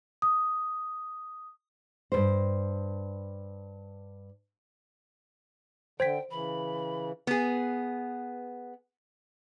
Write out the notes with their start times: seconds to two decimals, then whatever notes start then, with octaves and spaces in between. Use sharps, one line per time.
0.22 D#6
2.12 G2 B2 C5
6.00 D3 C5 G5 G#6 B6
6.31 C#3 E3 B5
7.27 B3 G#4